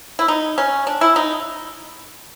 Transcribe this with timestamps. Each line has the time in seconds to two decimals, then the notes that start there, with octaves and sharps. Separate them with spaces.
0.19 E4
0.28 D#4
0.58 C#4
0.87 D4
1.01 E4
1.16 D#4